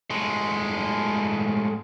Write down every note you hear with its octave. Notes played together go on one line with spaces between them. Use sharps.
A2 G#3